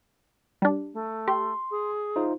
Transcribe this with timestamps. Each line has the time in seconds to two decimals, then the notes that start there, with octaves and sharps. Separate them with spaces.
0.62 G3 D4
0.93 A3
1.28 G4 C6
1.71 G#4
2.16 D#4 F4 C5